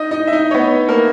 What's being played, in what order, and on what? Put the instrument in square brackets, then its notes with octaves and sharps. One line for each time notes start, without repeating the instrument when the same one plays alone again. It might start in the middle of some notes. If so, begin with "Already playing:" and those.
Already playing: [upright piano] D#4 D#5
D#4 D#5
E5
D#4 D#5
C#5
B3 B4
A#3 A#4